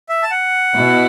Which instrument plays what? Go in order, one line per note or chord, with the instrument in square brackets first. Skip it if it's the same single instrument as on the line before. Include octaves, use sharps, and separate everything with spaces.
[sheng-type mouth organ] E5
A5
F#5
[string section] B2 B3 E4